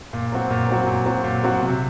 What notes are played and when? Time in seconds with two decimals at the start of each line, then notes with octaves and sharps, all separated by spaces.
0.13 A#2
0.32 F#3 C4 F#4
0.51 A#2
0.69 F#3 C4 F#4
0.87 A#2
1.06 F#3 C4 F#4
1.24 A#2
1.44 F#3 C4 F#4
1.62 C3